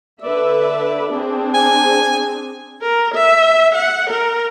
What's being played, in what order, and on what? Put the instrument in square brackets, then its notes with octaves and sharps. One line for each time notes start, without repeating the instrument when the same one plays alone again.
[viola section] D3 B4 E5 [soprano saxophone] D5
[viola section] C4 D4 G#4
[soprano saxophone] G#5
[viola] A#4
E5
F#5
A#4